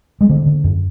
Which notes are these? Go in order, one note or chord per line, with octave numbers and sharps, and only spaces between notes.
G#3
D3 A#3
D3
F#2